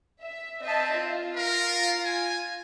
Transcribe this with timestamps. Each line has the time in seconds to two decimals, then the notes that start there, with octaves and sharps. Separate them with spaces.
0.22 E5
0.63 C4 D#5 E5 A5
0.96 F4
1.37 A#4
2.05 G#5